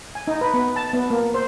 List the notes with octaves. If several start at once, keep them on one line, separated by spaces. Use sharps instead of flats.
G#5
D#4
B4
B3
A5
B3
A#3
C5